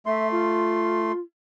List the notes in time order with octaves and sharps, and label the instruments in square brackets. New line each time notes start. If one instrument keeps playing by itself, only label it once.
[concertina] A3 C6 [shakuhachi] E5
[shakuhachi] F4